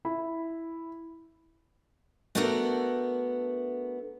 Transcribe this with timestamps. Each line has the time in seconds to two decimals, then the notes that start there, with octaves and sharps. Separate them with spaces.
0.05 E4 B5
2.35 A3 B3 D4 F#4 A4 A#4